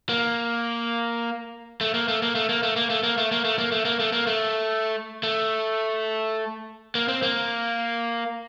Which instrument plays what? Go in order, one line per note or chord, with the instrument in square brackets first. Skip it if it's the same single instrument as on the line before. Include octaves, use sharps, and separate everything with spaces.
[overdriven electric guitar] A#3
A3
A#3
A3
A#3
A3
A#3
A3
A#3
A3
A#3
A3
A#3
A3
A#3
A3
A#3
A3
A#3
A3
A3
A#3
C4
A#3